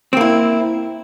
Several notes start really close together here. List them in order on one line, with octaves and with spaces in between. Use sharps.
C4 A#3 E4